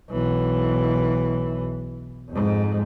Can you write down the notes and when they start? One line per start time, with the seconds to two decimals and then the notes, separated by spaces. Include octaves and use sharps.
0.10 B1 E3
2.30 F2 G#2